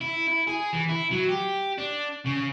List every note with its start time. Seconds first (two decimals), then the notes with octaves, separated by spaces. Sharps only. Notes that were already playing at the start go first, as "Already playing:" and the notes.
0.01 E4
0.28 E4
0.47 G#4
0.73 E3
0.89 E4
1.11 F#3
1.29 G4
1.78 D4
2.25 C#3